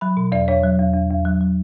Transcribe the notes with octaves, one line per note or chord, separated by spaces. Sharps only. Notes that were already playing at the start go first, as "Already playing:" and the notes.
F#3 B5
B2
E2 D5
E2 C#5
F#3
E2
E2
E2
F#3
F#3